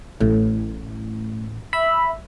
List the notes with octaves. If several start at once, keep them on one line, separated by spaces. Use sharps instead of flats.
A1 A2
E5 B5